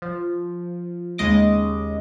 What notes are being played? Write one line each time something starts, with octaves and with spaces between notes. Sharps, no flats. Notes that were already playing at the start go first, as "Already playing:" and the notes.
F3
D#2 C#3 G#3 D#5 D6